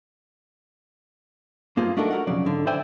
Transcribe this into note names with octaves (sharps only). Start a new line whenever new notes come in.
G2 A#3 F4 G#4 C5
A3 D4 D#4 F#4 A4 A#4
F#4 A#4 F#5
B1 F2 C#3 D5
G#2 D3
C5 D5 E5 G5 G#5 B5